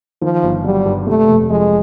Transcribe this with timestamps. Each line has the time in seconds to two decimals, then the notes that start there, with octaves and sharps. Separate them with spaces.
0.22 D#3 F3
0.43 G1
0.64 F#3 G3
0.86 G2
1.06 C3 A3
1.29 F1
1.50 F3 G#3